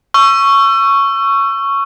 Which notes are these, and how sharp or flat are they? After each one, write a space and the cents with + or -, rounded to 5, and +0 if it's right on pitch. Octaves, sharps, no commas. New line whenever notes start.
C#6 +0 E6 +35